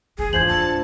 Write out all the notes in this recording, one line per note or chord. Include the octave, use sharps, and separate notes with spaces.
D2 E3 G#4
E2 G#2 F3 D4 F4 C5 G#6 F#7
D1 A5